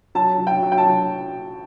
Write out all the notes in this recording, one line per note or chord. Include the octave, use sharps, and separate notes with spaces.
F#3 A5
F#3
G5
F#3
G5
A5
F#3